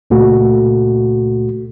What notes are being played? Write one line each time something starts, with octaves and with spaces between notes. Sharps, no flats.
C#2 A#2 A3 F#4